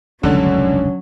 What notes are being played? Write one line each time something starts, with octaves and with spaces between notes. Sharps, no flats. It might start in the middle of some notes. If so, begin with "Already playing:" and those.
F1 C#2 G2 D3 F#3 C#4